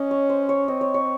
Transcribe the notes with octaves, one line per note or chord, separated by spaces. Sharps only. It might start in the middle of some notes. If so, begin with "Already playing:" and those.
Already playing: C#4 D#5
C#5
C5
C#5
C4 D#5
C#5
C#5